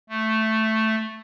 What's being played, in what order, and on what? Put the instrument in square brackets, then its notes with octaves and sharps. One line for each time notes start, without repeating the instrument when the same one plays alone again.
[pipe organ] A3